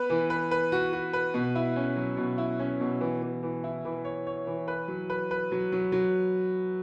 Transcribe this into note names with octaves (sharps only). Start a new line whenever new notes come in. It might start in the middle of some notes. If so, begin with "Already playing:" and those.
Already playing: B3 B4
E3
B4
B4
F#4
F#4
B4
B2
E4
C#4
F#3
B2
E4
C#4
B2
E3
E3
E3
E4
E3
C#5
C#5
E3
B4
F#3
B4
B4
F#3
F#3
F#3